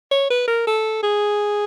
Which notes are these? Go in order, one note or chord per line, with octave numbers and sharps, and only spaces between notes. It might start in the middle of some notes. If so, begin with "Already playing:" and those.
C#5
B4
A#4
A4
G#4